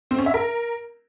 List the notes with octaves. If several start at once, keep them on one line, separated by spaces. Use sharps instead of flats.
C4
C#4
E5
A#4